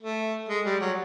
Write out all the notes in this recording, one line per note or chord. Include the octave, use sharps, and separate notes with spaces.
A3
G#3
G3
F#3